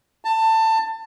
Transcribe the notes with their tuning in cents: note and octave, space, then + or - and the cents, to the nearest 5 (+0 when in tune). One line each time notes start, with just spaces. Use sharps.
A5 +20